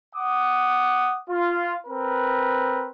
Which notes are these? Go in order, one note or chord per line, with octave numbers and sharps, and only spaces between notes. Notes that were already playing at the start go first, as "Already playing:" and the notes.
F#5 D6 D#6
F4
C4 A#4 B4